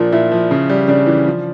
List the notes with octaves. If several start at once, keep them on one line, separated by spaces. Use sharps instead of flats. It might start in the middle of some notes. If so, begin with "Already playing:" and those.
Already playing: A#2 F3 D4
A#2 E4
F3
C#3
G3
C#3 D4
E3
F3